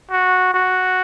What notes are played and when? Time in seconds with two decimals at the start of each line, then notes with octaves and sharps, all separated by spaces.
0.11 F#4
0.54 F#4